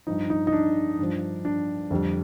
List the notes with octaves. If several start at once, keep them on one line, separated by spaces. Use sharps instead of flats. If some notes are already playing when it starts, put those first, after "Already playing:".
G2 F3 D#4
D#4
D#4
D4
G2 F3
D4
F2 D3 G3